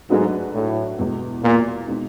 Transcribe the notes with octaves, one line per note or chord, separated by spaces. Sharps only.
G#2 F#3 A3 D4 F#4 B4
A2
E2 B2 G#3
A#2
B2 G#3 C4 D#4